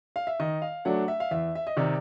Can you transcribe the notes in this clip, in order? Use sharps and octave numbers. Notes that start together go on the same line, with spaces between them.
F5
E5
D#3 D#5
F5
F#3 A3 D4 F#5
E5
F5
E2 E5
E5
D#5
C3 D#3 D5